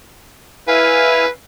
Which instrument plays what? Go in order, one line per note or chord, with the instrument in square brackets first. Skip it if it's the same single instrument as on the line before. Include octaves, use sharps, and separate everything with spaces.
[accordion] E4 F5 G#5 [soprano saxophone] B4